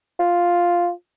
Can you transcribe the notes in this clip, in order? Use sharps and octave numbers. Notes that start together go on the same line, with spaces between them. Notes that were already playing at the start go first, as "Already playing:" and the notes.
F4